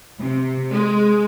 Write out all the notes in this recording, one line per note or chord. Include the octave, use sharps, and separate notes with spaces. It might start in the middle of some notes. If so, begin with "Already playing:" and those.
C3
G#3